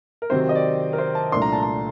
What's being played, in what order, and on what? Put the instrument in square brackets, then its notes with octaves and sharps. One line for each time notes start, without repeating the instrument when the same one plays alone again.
[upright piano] A#4
C3 D#3 F#3 C4 C5
D#5
D5
A#4
C5
A5
C2 A#2 A3 D4 C6
A#5
A5
A#5